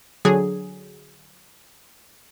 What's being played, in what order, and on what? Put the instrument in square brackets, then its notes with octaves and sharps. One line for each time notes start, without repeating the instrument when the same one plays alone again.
[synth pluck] D3 F#3 G#4